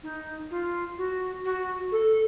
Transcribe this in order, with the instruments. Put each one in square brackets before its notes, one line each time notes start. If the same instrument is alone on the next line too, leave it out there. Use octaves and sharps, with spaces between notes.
[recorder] D#4
F4
F#4
F#4
A4